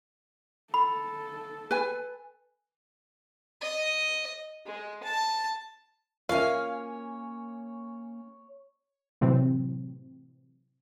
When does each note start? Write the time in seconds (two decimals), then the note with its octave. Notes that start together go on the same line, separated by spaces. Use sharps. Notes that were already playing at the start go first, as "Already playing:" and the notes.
0.74 A4 B5
1.71 B4 G#5
3.61 D#5
4.66 G#3
5.03 A5
6.29 A#3 C#4 F4 A#4 C#5 E5 F5 G#5
9.21 A2 C3 E3 F#3 C4